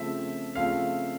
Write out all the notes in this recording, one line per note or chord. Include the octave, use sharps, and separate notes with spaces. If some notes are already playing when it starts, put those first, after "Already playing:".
Already playing: C#3 F3 A3 C4 E5
C#3 F3 A3 C4 F5